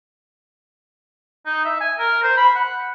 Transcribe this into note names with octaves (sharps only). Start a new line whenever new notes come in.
D#4
E5
G#5
A#4
C5
B5
F#5